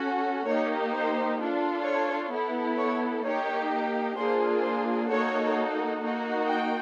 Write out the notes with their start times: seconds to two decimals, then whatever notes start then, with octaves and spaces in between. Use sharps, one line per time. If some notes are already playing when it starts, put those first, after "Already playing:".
Already playing: C#4 F#4 A4
0.46 A#3 D#4 G4 C#5
0.92 C5
1.38 D4 F4 A4
1.84 C#5
2.31 B3 E4 A4
2.77 C#5
3.23 A#3 D#4 G4 C#5
4.16 A#3 D4 F4 G#4 C5
4.63 C5
5.09 A#3 D#4 F#4 A4 C#5
6.01 A#3 D#4 F#4
6.47 G5